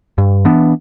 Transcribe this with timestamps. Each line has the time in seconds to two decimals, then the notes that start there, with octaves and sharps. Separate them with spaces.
0.18 G2
0.45 E3 B3 D4